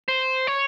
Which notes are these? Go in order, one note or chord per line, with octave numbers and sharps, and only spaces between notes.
C5
C#5